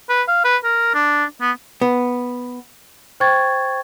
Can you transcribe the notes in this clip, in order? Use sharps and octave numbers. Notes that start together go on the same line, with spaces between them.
B4
F5
B4
A#4
D4
B3
B3
C5 G5 C#6 G#6 A6